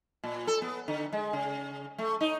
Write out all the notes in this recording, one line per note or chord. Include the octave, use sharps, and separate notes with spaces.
A#2
A4
B3
D3
G#3
C#3
A3
D#4